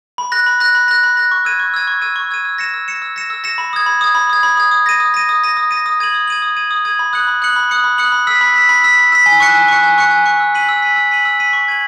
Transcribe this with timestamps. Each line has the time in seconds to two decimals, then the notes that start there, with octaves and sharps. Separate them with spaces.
0.18 B5
0.32 F#6 A#6
0.46 B5
0.60 F#6 A#6
0.75 B5
0.88 F#6 A#6
1.03 B5
1.17 F#6 A#6
1.31 C#6
1.45 E6 G#6 D#7
1.60 C#6
1.74 E6 G#6 D#7
1.87 C#6
2.02 E6 G#6 D#7
2.16 C#6
2.31 E6 G#6 D#7
2.45 E6
2.58 A#6 C#7 E7
2.74 E6
2.88 A#6 C#7 E7
3.02 E6
3.16 A#6 C#7 E7
3.30 E6
3.44 A#6 C#7 E7
3.58 B5
3.73 D#6 G#6
3.86 B5
4.01 D#6 G#6
4.15 B5
4.30 D#6 G#6
4.43 B5
4.57 D#6 G#6
4.71 D#6
4.86 A#6 D#7
5.00 D#6
5.14 A#6 D#7
5.29 D#6
5.44 A#6 D#7
5.57 D#6
5.71 A#6 D#7
5.86 D#6
6.00 G#6 D#7 F#7
6.14 D#6
6.28 G#6 D#7 F#7
6.42 D#6
6.57 G#6 D#7 F#7
6.71 D#6
6.85 G#6 D#7 F#7
6.99 B5
7.13 D#6 F#6 C#7 F#7
7.27 B5
7.42 D#6 F#6 C#7 F#7
7.56 B5
7.70 D#6 F#6 C#7 F#7
7.84 B5
7.98 D#6 F#6 C#7 F#7
8.12 B5
8.27 E6 B6
8.41 B5
8.56 E6 B6
8.69 B5
8.84 E6 B6
8.98 B5
9.12 E6 B6
9.26 G#5
9.40 C#6 F#6 C#7
9.55 G#5
9.68 C#6 F#6 C#7
9.83 G#5
9.98 C#6 F#6 C#7
10.11 G#5
10.26 C#6 F#6 C#7
10.40 E6
10.55 B6 D#7 F#7
10.69 E6
10.82 B6 D#7 F#7
10.96 E6
11.11 B6 D#7 F#7
11.25 E6
11.40 B6 D#7 F#7
11.53 C#6
11.68 G#6 D#7 F#7